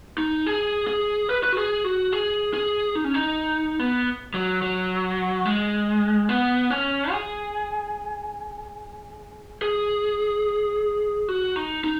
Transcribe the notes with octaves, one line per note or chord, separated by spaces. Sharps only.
D#4
G#4
G#4
B4
B4
F#4
G#4
F#4
G#4
G#4
D#4
C#4
D#4
B3
F#3
F#3
G#3
B3
C#4
G#4
G#4
F#4
D#4
D#4